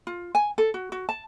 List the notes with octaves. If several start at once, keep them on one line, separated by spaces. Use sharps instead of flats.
F4
G#5
A4
F#4
F#4
A5